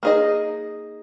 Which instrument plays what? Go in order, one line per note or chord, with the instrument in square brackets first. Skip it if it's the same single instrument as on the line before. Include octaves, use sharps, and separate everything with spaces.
[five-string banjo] A#3 D#4 G#4 D#5